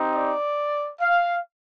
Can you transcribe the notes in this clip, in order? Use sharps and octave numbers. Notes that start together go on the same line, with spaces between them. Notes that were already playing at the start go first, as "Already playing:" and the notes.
Already playing: C4 D#4 G4
D5
F5